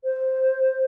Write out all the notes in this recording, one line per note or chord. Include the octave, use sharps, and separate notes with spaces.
C5